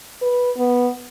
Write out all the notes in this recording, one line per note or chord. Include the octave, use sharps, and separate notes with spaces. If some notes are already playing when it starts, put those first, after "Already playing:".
B4
B3